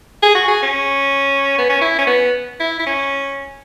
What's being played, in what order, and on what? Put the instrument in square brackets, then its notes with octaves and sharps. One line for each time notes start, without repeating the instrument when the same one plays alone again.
[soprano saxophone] G#4
F#4
G#4
C#4
B3
C#4
E4
C#4
B3
E4
E4
C#4